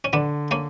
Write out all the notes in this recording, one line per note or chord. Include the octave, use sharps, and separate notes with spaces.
C#4
D3 B3 D4
A#3 C#4